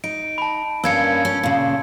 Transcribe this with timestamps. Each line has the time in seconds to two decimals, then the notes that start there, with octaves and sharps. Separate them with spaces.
0.04 D#4 D7
0.38 A5 B5
0.84 G2 A#3 C#4 E6 G#6 C#7
1.25 C#4
1.43 A#2 C#3